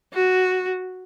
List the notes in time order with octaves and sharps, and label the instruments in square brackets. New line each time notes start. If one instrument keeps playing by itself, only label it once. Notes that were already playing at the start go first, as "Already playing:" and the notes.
[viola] F#4